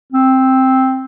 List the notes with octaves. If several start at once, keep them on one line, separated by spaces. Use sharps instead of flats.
C4